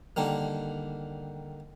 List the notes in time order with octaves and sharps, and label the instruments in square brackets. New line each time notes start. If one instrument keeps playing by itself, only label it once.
[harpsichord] D3 D#3 G3 A#3